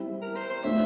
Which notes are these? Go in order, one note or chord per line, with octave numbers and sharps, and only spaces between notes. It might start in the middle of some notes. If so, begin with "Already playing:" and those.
Already playing: G3 C4 E4
A#4
C5
C5
A3 D4 F4 C5 E5